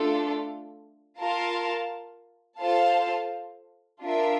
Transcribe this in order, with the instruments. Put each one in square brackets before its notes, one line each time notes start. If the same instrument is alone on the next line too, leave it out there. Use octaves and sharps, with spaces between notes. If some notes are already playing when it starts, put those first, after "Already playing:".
Already playing: [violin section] A3 D4 F4 A4
F4 A#4 F5 A5
F4 A4 C5 F5 A5
D4 F4 A#4 E5